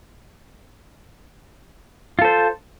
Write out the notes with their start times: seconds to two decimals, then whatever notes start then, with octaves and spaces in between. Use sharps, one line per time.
2.19 F4
2.22 A4
2.25 C5